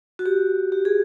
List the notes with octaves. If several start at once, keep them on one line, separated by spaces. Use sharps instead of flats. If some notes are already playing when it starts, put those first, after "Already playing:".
F#4
G4
G4
G#4